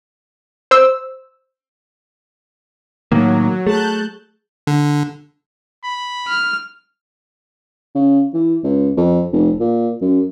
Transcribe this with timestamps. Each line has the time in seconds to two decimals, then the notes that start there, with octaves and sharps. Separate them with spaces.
0.71 C5 E6
3.12 A2 D#3 F#3 A#3
3.67 A3 G#4 A5 F#6 G6
4.67 D3
5.85 B5
6.28 F6
7.95 C#3
8.34 E3
8.64 C#2
8.97 F2
9.33 F1
9.60 A#2
10.01 F#2